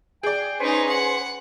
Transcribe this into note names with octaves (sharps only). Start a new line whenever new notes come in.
G#4 D5 G5
C#4 D#4 B4 C5 G#5
F#5